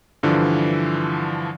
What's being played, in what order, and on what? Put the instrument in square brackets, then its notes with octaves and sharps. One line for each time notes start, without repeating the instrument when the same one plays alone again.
[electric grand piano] G2 D3 E3 F3